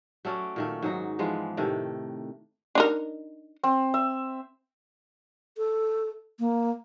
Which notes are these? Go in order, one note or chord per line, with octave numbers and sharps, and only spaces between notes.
F#3 A3 C#4 D5
A#2 D#3 A3
G#2 F#3 D#4
E3 F3 G#3 B3
A2 C3 D#3 A3
D4 D#4 A#4
C4
E5
A4
A#3